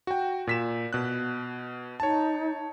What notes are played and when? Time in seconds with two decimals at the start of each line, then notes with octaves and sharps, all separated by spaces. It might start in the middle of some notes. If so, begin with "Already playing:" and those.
0.07 F#4 G5
0.47 A#2 B6 E7
0.93 B2 F#6
2.00 D#4 C#5 A5